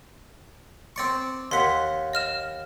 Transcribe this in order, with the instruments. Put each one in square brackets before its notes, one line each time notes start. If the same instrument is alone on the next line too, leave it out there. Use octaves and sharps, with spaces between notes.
[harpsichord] C4 D5 C#6
[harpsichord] D#2 F#5 [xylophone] C6 B6
[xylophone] D#5 F6 E7